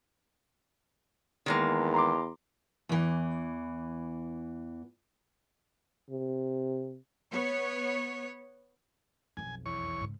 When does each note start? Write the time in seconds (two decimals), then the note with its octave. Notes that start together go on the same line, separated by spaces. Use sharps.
1.46 E2 D#3 G#3 A#3
1.94 A#5 C6 D6
2.89 E2 E3
6.10 C3
7.32 B3 C#5
9.37 B1 F2 G#5
9.66 E2 C#5 C#6
10.01 G#2 C#3